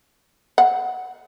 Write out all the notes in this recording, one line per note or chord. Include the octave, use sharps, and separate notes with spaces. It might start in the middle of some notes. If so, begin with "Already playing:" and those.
F#5